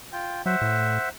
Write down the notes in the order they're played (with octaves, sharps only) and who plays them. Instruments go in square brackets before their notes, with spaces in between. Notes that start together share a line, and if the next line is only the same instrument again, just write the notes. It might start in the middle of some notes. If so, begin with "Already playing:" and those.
[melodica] F4 G5
[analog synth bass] F#3 [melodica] C5 E5 F#5
[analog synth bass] A2